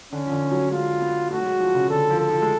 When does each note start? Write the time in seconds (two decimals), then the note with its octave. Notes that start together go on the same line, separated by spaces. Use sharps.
0.12 D3 C#4
0.26 F3
0.32 D3
0.51 F#3
0.71 G#3 F4
1.01 B3
1.30 A3 F#4
1.38 F#3
1.45 G#3
1.60 F3
1.75 C#3
1.89 D3 A4
2.10 F3
2.20 A4
2.29 F3
2.42 G#3